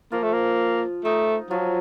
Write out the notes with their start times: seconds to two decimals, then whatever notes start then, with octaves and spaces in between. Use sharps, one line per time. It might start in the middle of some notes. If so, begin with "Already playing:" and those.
0.12 F3 A#3 F4
0.23 A3
0.33 A#3
1.04 A3 D#4
1.50 F3 F#3 F4